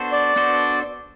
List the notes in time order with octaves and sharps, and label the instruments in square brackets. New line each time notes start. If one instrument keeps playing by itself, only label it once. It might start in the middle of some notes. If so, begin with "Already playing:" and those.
Already playing: [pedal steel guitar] B3 D4 F#4 A4 C5
[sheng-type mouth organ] D5
[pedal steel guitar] B3 D4 F#4 A4 C5